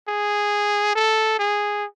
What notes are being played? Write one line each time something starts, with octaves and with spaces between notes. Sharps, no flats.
G#4
A4
G#4